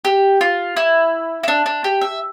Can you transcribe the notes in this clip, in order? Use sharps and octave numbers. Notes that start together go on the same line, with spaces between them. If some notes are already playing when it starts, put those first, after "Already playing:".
G4
F4
E4
E4
D4
D4
G4
E5